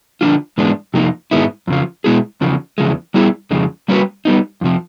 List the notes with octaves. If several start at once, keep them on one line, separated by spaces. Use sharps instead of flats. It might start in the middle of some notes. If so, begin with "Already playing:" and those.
D3 F3 A3 D4 F4
G#2 E3 G#3 B3 D4
F2 C3 F3 A#3 D#4
G#2 D#3 G#3 B3 E4
F2 C#3 F3
B2 G#3 B3 E4 G#4
E2 C#3 F3
E2 C#3 F3 G#3
G3 B3 E4 G#4
F2 C#3 F3 G#3
G3 A#3 C#4 F#4 B4
G3 B3 D#4
F2 C3 F3